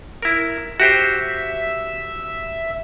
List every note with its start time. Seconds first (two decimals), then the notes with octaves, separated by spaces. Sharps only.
0.23 E4 A#4
0.80 F#4 G4 C5 E5